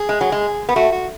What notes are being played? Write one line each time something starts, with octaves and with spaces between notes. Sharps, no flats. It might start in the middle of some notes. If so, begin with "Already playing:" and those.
Already playing: G#4
G#3
F#3
G#3
B3
A3 F#4
F#4